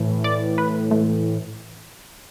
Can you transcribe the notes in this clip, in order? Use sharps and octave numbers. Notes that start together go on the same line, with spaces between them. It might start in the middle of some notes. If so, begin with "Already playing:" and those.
Already playing: A2 E3
D5
B4
A3